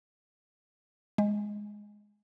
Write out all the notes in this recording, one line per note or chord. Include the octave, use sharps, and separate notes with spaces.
G#3